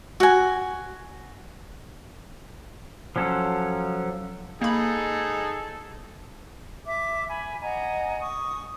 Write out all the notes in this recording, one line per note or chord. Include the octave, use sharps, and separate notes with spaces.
F#4 G#5
F3 F#3 C#4 A4
A#3 D#4 G#4 A4 B5
E5 D6
G#5 B5
D#5 F#5 G#5 A#5
C#6 D#6